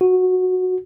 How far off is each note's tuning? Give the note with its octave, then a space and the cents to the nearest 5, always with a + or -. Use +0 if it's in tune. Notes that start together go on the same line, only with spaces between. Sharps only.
F#4 -10